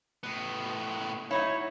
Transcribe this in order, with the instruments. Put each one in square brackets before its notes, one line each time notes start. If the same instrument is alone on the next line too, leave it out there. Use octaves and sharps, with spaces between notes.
[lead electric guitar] A2 B3
[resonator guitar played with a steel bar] F#3 D#4 E4 [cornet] C#5